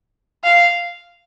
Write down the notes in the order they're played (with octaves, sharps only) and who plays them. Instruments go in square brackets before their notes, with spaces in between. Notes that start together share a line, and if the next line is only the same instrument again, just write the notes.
[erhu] F5